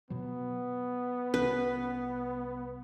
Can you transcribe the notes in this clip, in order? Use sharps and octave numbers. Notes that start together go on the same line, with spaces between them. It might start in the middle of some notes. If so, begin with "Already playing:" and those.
B2 F#3 B3
C2 C#4 B4